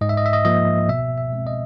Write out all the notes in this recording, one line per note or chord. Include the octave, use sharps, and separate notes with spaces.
G#2 D#5
E5
D#5
E5
D#5
F3 A#3 D#5
B2 E5
E5
G#3 C4
D#5